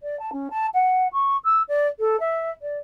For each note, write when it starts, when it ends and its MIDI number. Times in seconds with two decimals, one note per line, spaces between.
0.01 0.18 74
0.19 0.30 81
0.32 0.48 61
0.50 0.66 81
0.74 1.07 78
1.12 1.36 85
1.44 1.62 88
1.68 1.87 74
1.99 2.16 69
2.19 2.50 76
2.61 2.78 74